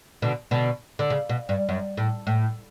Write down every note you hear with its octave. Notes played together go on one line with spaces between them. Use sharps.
B2 D3
B2 D3
D3
C#3
B2
G2
F#2
A2
A2